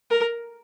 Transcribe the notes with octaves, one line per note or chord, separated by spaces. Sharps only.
A#4